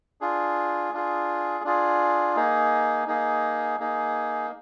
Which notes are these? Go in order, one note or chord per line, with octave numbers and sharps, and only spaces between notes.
D4 F4 G#4
D4 F4 G#4
D4 F4 G#4
A#3 D#4 G#4
A#3 D#4 G#4
A#3 D#4 G#4